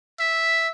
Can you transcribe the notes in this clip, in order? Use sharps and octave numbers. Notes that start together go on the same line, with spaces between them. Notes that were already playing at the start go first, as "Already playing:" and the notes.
E5